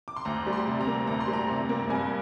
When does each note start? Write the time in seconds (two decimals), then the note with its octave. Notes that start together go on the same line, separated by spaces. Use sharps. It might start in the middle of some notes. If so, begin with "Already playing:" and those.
0.08 D6
0.16 C6
0.25 D2 A#5
0.46 G3
0.53 C6
0.67 C3
0.81 A#5
0.87 A#3
1.07 D2 A#5
1.20 C6
1.28 G3
1.33 A#5
1.49 C3
1.69 A#3
1.89 G2 G#5